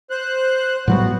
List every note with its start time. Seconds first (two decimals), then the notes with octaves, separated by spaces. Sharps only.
0.10 C5 F#6
0.88 A2 F#3 G3 B3 F#4